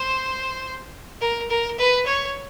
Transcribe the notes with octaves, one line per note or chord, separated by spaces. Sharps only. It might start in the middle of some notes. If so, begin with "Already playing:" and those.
Already playing: C5
A#4
A#4
B4
C#5